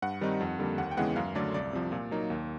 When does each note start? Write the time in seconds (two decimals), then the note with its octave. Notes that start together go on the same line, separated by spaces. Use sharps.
0.02 G2 F#5
0.21 D#3 G3 C4 D#4
0.41 F2
0.59 D3 G3 A#3
0.78 D#2 F#5
0.91 G5
0.97 C#3 E3 G#3 B3 F#5
1.16 F#2 F5
1.35 D3 F#3 A3 D5
1.54 C2 D5
1.73 C3 F3
1.92 A#2
2.11 F#3 A#3 D#4
2.30 D#2